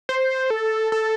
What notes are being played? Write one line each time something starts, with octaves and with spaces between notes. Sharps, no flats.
C5
A4
A4